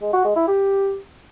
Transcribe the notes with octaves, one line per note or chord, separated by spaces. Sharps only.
G#3
F#4
G#3
E4
G4